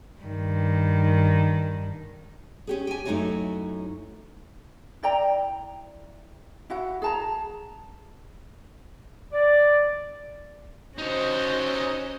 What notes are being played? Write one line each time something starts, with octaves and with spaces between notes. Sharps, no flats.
G2 D#3
C#4 G4 G#4
G4 G#5
F#2 A3 D#4 E4 F#4 C#5
E4 D5 G5 A#5
E4 F#4 F#5
G#4 A5 A#5
D5
C#4 D#4 F#4 C5 C#5 D#5